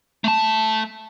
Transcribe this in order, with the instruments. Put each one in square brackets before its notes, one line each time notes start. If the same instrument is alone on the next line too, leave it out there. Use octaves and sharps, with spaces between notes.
[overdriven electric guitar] A3 A5